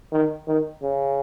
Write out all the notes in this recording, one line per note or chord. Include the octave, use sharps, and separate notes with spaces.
D#3
D#3
C#3